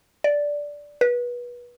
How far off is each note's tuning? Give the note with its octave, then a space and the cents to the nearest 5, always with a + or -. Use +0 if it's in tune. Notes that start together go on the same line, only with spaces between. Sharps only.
D5 -5
B4 -25